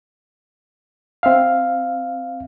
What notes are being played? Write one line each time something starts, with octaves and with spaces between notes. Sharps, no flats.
C4 E5 F5